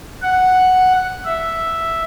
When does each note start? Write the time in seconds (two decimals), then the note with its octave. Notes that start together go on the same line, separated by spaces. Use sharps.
0.22 F#5
1.25 E5